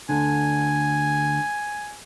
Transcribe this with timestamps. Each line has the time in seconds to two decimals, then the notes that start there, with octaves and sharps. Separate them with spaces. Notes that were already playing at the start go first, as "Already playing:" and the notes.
0.09 D2 D3 G#5